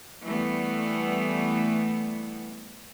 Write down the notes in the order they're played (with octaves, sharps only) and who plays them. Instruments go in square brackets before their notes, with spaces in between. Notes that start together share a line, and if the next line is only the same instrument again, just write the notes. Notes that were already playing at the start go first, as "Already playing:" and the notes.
[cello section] E3 G3 A3 B3